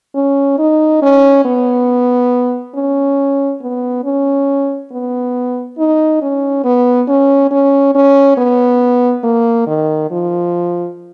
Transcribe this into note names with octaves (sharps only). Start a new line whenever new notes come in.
C#4
D#4
C#4
B3
C#4
B3
C#4
B3
D#4
C#4
B3
C#4
C#4
C#4
B3
A#3
D#3
F3